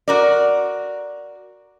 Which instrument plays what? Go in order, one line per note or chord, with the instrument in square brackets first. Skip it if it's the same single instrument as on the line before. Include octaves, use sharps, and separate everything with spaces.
[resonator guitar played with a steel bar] F#4 A#4 D5